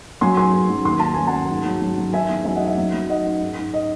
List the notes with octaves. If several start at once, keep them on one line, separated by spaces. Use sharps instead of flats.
F#3 G#5 C6
G#2 G#5 C6
G#2
F#3
D#2 C6
D#3 A5
F#3 G#5
F#5 A5
F#3
G#2
F#3
F#3
F#3
D#3 E5 G#5
E2
F#3 E5 G#5
D#5 F#5
D#3
E5
F#3
F#3
D#3 D#5 F#5
D#3
G#2
G#2
D#5